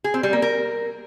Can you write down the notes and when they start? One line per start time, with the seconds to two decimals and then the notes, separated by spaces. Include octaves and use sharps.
0.04 G#4
0.14 C4
0.23 G3
0.33 A#3
0.42 A#4